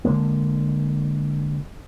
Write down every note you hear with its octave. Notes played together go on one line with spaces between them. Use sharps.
D3 F#3 G#3 A#3